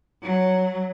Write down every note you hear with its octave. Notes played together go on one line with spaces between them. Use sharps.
F#3